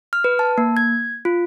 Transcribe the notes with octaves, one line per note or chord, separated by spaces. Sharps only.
F6
B4
A5
A#3
G#6
F4